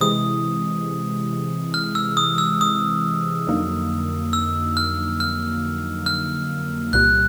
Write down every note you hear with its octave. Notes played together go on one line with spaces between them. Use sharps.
C3 E3 G#3 D#6
F6
E6
D#6
E6
D#6
F2 D3 F#3 A#3 D#4
E6
F6
F6
F6
C2 A#2 G3 F#6